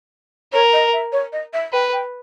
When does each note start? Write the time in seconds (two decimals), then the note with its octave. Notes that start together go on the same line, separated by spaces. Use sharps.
0.52 A#4 C#5
0.73 D#5
0.93 E5
1.12 C#5
1.33 D#5
1.53 E5
1.73 B4 G5
1.93 G5